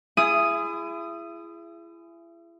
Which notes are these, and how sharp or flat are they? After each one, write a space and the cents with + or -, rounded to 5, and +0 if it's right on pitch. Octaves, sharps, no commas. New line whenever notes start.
E4 +35 G#4 +0 D#6 +0